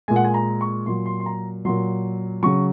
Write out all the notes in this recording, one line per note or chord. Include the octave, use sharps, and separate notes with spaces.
A#2 G#3 G#5
F#5
G#5
A#5
C#6
A#2 F#3 C6
C6
C6
A#5
A#2 F#3 C6
C#3 F#3 C#6